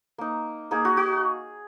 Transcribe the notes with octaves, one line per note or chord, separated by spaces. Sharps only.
A#3 D#4
A#3 D#4 G#4
F#4
F#4